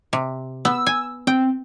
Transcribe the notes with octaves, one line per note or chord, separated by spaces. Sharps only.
C3
B3 E6
G#5
C4 G5